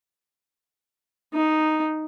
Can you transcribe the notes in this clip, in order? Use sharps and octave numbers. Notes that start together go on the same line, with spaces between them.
D#4